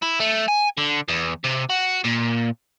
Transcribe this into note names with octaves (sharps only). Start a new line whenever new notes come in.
E4
A3
G#5
D3
E2
C3
F#4
A#2